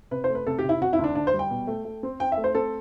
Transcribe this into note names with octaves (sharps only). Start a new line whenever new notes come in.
C3 B4
C5
A3
B4
C3 A4
G4
C3
E4
C3 F#4
E4
D2
D4
D2 D4
C5
G3
G5
B2
A3
A3
C4
C4 G5
E5
A3
C5
C4 A4